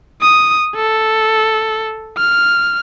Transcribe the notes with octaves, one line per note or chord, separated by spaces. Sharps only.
D#6
A4
F6